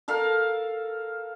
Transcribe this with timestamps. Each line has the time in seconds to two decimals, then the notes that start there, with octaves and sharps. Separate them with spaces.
0.08 A4 A#4 F5